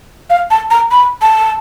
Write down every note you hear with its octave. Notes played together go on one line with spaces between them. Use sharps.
F5
A5
A#5
B5
A5